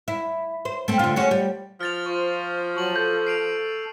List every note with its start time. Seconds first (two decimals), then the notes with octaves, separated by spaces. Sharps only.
0.08 E4
0.65 C5
0.88 A3 C4
0.99 D3 F4
1.16 C#4 F#4 G#4
1.31 G3
1.81 F3 F6 A6 F7
2.06 F4 C5 C#6
2.77 F#3 F#4 A5 C#6 F#7
2.96 A4 G6
3.27 C7 D7 F7